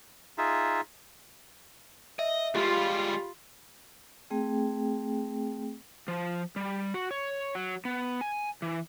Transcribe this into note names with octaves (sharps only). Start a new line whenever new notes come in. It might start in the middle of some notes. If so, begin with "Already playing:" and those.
D#4 F4 G#4 E5
D#5 E5
G3 G#3 F4 G4 B5
A3 C4 G#4 G5
F3
G3
F#4
C#5
F#3
B3
G#5
E3